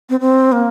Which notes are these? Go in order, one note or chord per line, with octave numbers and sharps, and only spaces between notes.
C4
C4
A#3